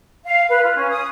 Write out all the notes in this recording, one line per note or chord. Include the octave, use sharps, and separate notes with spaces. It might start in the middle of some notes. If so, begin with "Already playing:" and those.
F5
B4
F4
C#4
D#6